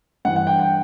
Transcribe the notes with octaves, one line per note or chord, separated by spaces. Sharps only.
G2 E3 F#5
F#5
G5
G5